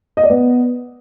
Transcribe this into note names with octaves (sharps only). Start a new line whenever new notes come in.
D#5
D5
B3